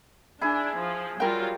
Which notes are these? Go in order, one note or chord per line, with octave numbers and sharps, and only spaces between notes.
D4 E4 G#4
F3
F#3 G3 F4 A#4 G5